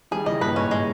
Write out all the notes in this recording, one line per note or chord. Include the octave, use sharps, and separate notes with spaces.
D#3 G3 G#4
C#3 E3 D#5
G2 A#2 B4
G#2 C#4
G#3